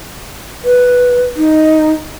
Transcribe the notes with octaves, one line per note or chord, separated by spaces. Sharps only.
B4
D#4